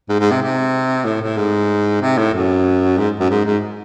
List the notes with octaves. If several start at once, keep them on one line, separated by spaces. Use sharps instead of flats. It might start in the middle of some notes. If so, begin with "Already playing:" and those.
G#2
G#2
C3
C3
A2
A2
G#2
C3
A2
F#2
G#2
F#2
G#2
G#2